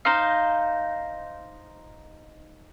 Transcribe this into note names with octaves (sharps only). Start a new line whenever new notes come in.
D#4 C5 F5